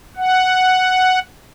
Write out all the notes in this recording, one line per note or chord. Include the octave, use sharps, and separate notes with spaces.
F#5